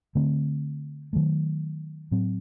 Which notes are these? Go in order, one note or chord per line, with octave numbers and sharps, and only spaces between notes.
D3 A3 C4
D#3 F#3 A3
A2 F#3 C4